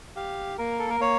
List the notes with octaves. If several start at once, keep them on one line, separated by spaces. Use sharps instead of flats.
G4 F5
A#3 A#4
A4
A#4
A#3 C#5